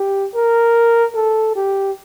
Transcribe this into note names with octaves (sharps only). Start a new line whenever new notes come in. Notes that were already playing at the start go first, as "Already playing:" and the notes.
Already playing: G4
A#4
A4
G4